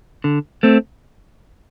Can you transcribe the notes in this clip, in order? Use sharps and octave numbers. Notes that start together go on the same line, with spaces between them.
D3
A3 C4